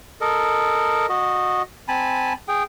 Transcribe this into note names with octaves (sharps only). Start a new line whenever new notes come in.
A4 A#4 D#5
F#4 D#5
C4 G#5 A5 B5
G#4 G5